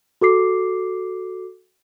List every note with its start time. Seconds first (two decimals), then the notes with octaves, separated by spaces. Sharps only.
0.21 F#4 A4 D6 C7